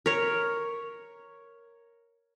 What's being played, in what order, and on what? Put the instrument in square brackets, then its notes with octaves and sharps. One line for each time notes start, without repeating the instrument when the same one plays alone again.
[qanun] A#4 C#5